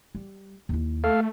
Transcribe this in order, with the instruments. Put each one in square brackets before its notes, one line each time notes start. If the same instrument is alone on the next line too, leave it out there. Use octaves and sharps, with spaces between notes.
[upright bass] G3
D#2 E4
[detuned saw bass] A3 [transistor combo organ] A4 F5